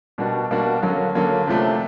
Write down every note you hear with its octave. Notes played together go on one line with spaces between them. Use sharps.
B2 G3 A#3 D4 F#4
B2 G3 A#3 D4 F#4
D3 F#3 A#3 C#4
D3 F#3 A#3 C#4
C3 F3 A3 D4